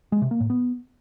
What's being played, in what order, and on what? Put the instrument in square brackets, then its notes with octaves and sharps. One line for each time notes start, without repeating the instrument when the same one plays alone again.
[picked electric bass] G#3
C3
A#3
A2
B3